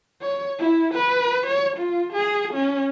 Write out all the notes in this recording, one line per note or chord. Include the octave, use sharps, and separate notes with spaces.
C#5
E4
B4
C#5
F4
G#4
C#4